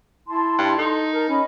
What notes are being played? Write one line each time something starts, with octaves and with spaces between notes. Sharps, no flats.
E4 A5 C6
G2
D#4 A4
A#4 A5
C#4 D#5 B5